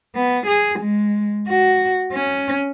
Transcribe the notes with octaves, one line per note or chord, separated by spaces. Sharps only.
B3
G#4
G#3
F#4
C#4